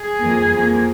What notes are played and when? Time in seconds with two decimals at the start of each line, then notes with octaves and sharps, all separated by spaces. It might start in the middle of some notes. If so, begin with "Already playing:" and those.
Already playing: G#4
0.20 F2 D#3 A#3
0.52 F2 F3 A#3